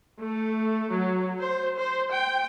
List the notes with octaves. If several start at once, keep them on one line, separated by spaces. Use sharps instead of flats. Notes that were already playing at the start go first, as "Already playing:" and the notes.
A3
F#3
C5
C5
G5